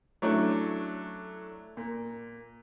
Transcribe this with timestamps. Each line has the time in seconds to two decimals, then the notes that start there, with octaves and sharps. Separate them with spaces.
0.22 F#3 A3 C#4 D4 E4
1.77 A#2